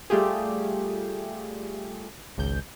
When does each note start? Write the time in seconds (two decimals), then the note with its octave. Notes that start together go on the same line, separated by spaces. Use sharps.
0.10 G3 A3 F4 G4 G#4
2.37 G#1 C#2 G6